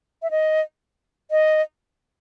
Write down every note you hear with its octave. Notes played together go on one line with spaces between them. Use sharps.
E5
D#5
D#5